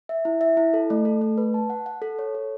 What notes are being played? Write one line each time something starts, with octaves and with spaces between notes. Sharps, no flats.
E5
E4
E5
E4
A4
A3
A4
A3
B4
A5
F#5
F#5
A4
C#5
A4